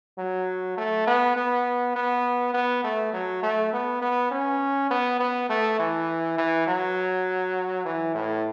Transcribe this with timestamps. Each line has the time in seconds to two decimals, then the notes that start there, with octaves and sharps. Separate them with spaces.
0.18 F#3
0.77 A3
1.07 B3
1.36 B3
1.96 B3
2.54 B3
2.84 A3
3.13 F#3
3.43 A3
3.73 B3
4.01 B3
4.31 C#4
4.90 B3
5.20 B3
5.49 A3
5.79 E3
6.38 E3
6.67 F#3
7.85 E3
8.15 A2